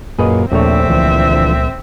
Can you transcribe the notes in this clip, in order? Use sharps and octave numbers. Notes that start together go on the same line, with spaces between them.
F#2 A#2 F#3 A#3 G#4 B4 D#5
A#1 D#2 A3 C4 D4 C#5 E5
C#2 D3 E3 F3